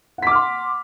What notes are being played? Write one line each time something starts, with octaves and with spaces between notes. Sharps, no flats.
F#5 C6 D6 F6 B6